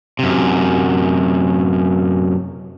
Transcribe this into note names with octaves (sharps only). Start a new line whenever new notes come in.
F#2 C3